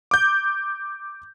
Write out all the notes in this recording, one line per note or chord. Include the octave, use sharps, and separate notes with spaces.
D6 G6